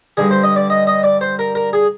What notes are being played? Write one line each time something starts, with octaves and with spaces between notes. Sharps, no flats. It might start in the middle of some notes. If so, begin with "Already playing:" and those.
G2 D3 G#4
C5
D#5
D5
D#5
D#5
D5
C5
A#4
A#4
G#4